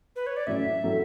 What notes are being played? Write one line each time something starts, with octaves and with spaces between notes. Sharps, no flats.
B4
C#5
D5
A2 F#3 C#4 E5
A2 F#3 A3